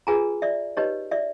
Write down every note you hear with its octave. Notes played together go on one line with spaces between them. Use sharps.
F4 G#4 B4 G#5 A#5
D5 E5
D#4 G4 B4 C#5 D#5
D5 E5